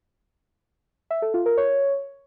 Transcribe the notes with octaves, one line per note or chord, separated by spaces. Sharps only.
E5
A4
F4
A#4
C#5